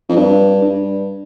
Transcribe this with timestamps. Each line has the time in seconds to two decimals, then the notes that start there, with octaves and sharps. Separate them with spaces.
0.09 F2
0.16 G2
0.62 G2